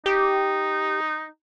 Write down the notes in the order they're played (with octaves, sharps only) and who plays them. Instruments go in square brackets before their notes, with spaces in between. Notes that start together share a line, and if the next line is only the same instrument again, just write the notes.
[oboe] D#4 [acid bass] G4